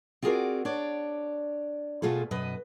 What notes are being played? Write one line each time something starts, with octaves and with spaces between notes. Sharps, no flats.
C4 F4 F#4 G#4 A#4 D5
D4 C#5 D5
B2 A3 F4 G#4 A4
F#2 B2 B4 D#5